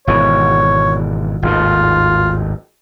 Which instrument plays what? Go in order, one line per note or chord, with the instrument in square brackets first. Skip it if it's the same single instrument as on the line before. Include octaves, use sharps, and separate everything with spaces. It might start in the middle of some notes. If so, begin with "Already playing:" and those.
[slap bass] G#1 B2 E3 [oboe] C#5
[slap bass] G#1 D#2 A2 [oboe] F4